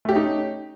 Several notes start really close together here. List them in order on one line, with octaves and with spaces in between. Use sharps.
A3 G4 C#4 D#4